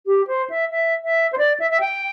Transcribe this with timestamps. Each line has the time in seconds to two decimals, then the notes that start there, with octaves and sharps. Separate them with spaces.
0.06 G4
0.27 C5
0.50 E5
0.71 E5
1.04 E5
1.33 C5
1.38 D5
1.60 E5
1.70 E5
1.80 G5